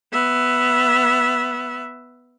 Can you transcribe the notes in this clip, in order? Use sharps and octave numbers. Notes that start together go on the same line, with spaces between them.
B3 E5